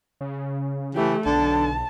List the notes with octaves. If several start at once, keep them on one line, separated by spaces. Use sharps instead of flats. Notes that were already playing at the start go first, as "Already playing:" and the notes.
C#3
E3 A3 G4
B1 D3 A5